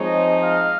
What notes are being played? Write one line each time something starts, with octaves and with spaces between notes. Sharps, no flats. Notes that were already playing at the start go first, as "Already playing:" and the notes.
Already playing: F3 G#3 C4 D#4 C#5 D#5
D#5 F5